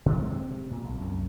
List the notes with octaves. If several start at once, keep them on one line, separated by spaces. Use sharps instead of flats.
B2 D#3
G#3 C4
C3
A#2
B1
C2 F#2